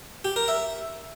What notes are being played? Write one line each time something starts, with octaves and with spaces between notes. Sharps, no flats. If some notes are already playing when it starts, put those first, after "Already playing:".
G4
A#4
E5